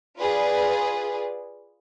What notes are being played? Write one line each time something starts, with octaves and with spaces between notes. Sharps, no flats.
F4 G#4 B4 D5